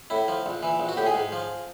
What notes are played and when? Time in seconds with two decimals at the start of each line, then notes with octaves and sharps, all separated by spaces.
0.10 A2 E4
0.28 F3
0.46 A#1
0.63 E3
0.80 A#1
0.89 F#4
0.97 A2 G4
1.06 G#4
1.14 G#2
1.32 F3